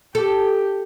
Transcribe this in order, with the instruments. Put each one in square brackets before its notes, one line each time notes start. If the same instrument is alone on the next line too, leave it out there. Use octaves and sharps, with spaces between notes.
[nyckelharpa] G4 [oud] A4